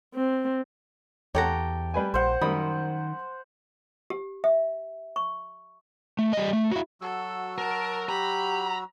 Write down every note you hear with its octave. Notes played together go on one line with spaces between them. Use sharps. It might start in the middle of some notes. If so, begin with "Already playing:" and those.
C4
E2 G4 A4 C#5 F#5 A#5
G3 B4 G#5
A#1 C5 F#5
F#2 D#3 G3 B5 D#6
G4
E5
C#6
A3
G3 D#5
A3
E4 F#4
F#3 F#4 A4 E6
A#4 A5
G4 A#5 B5